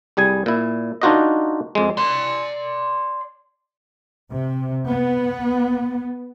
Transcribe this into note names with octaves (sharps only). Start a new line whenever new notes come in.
C2 G3 G#4 G#5
A#2 E4
D4 D#4 F4 F#4 A#4 D#5
F2 G#3
D5 C6
C3
B3